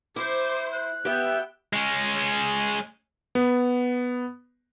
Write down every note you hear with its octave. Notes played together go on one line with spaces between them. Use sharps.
E4 C5 D6
F#6
B3 G4 E5 G5
G#3 C#4
B3